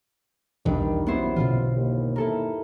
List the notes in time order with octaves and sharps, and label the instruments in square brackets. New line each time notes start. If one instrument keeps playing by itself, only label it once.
[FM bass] B1 [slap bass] E2 D4 [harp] G2 [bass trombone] D#3
[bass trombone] F#2 [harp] B3 E4 C5
[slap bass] B2 D3 E3 [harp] F4
[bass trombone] D#2
[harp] E4 A4 A#4